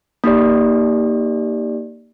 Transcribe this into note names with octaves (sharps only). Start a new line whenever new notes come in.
A#3 D#4 G4 D5